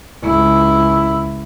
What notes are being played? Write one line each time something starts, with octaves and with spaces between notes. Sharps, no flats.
C#2 E4